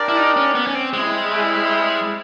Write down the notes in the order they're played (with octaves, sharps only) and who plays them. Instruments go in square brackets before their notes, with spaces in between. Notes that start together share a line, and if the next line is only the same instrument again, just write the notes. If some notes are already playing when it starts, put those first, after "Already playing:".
Already playing: [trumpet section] D4 G4 A#4 D5 F5
[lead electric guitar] E4
D#4
C#4
B3
C#4
C4
[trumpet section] G3 C4 E4 [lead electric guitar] G#3